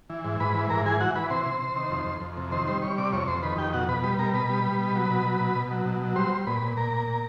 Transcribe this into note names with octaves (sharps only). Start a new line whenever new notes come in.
E3
G#2
G#2 B4 B5
E3
G#2 A#4 A#5
E3 G#4 G#5
E3 F#4 F#5
E3 B4 B5
C3 C5 C6
C3
C3
D#3
F2
F2
F2
C3
D#3 C5 C6
G3 C5 C6
G3 C#5 C#6
C3 D5 D6
F2 C#5 C#6
F2 C5 C6
D#3 B4 B5
F2 G4 G5
B2 F#4 F#5
B2 B4 B5
G3 B4 B5
B2 A#4 A#5
B2 B4 B5
G3
G3
B2
F#3
B2
F#3
B2
B2
F#3
B2
F#3
G3 C5 C6
G3
A#2 B4 B5
A#2
A#2 A#4 A#5
A#2
A#2